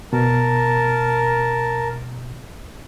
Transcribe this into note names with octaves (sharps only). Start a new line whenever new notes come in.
B2 A#4 A5